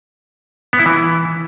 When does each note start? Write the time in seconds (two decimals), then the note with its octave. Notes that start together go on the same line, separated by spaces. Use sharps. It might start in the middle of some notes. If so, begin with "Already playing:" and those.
0.73 B3
0.79 E4
0.86 E3